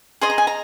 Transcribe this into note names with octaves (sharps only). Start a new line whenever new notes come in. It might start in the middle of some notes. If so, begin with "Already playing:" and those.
G#4 D#5 C6
A#5
G#5
A#5